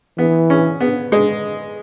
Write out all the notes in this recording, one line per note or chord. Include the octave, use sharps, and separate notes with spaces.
E3 B3
C#4
B3
G#3